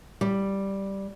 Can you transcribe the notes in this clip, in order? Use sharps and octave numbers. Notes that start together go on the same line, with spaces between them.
G3